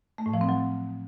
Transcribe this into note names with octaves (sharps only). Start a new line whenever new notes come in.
A3
A2
F3
C4
F#3